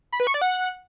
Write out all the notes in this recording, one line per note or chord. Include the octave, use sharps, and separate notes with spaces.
B5
B4
C#6
D5
F#5